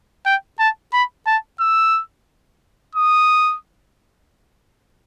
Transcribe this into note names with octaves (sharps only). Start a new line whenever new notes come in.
G5
A5
B5
A5
E6
D#6